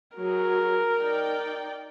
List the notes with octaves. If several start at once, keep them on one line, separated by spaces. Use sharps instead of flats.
F#3 G#4 A#4
D#4 D5 G5